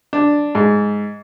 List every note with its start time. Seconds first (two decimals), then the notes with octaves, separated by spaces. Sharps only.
0.13 D4
0.55 G#2